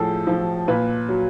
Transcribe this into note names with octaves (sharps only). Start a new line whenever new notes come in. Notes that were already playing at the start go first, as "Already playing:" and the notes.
Already playing: A2 F3 G#4 A4
F3
A#2 B4
F#3